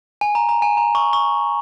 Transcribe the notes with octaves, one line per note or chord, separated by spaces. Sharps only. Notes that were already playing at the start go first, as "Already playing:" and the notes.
G#5
A#5
A#5
G#5
A#5
C#6
C#6